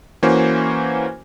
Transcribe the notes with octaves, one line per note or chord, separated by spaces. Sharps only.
E3 A#3 C#4 F#4 C5